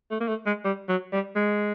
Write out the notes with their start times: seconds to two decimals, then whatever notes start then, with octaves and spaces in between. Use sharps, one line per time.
0.11 A3
0.20 A#3
0.28 A3
0.46 G#3
0.65 G3
0.89 F#3
1.13 G3
1.36 G#3